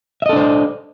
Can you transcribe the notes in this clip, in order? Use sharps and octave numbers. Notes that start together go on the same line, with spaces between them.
D4 A4 C5 D#5 E5